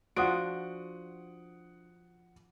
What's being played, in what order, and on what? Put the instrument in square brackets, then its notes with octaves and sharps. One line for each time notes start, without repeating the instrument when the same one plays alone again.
[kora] F3 D4 F#4 [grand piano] F#5 D#6 D7